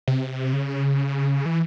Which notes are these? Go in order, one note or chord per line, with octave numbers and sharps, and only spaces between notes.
C3
C#3
E3